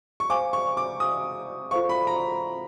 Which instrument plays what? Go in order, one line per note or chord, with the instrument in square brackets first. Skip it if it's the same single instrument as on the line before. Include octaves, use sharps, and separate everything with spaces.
[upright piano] C#6
[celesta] C5 F5 G#5 [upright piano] D6
[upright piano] C#6
D6
[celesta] C5 F5 G#5 [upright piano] D#6
[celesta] F4 A4 C5 F5 [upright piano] C#6
[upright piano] B5
A#5